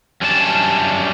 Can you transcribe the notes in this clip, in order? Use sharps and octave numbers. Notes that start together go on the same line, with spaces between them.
F#2 G3 C#4 D4 G4 A5